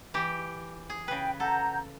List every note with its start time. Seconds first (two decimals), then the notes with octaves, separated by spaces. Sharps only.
0.14 E3 G4
0.90 G#4
1.08 C#3 B4 G5
1.40 A4 F#5 A#5 G6